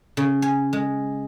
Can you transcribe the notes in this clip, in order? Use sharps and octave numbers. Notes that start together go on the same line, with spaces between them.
C#3
G#5
G#3